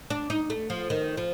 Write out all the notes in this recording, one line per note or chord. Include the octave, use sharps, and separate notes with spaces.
D4
D#4
A3
F3
D#3
F3